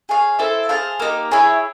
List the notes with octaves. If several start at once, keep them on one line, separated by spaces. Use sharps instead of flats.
G#4 C#5 F5
E4 A4 C5 E5
G#4 C5 F5 A5
A#3 D#4 G4
E4 G#4 C#5